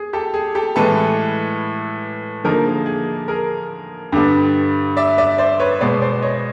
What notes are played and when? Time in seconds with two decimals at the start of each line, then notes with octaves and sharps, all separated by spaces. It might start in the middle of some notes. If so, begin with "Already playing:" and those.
Already playing: G#4
0.13 G4 A4
0.34 G#4
0.55 G4 A4
0.76 A2 E3 G#3 A4 B4
2.44 D3 F3 A#3 D#4 G#4 A#4
2.66 G#4
2.86 G#4
3.28 G#4 A#4
4.12 G2 D3 G3 B3
4.97 D5 E5
5.18 D5 E5
5.38 C5 D5
5.60 B4 C#5
5.81 B2 G#3 B3 C5 D5
6.02 C5 D5
6.22 C#5 D#5